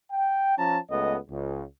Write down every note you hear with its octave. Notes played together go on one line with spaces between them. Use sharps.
G5
F3 C#4 A5 A#5
C#2 A3 B3 D#5
C#2